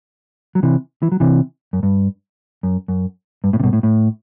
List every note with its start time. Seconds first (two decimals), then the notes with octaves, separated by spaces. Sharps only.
0.55 F#3
0.63 C3 E3
1.03 E3
1.12 F#3
1.20 C3 E3
1.73 F#2
1.83 G2
2.63 F#2
2.88 F#2
3.44 G2
3.53 A2
3.60 C3
3.63 G2 B2
3.73 A2
3.83 A2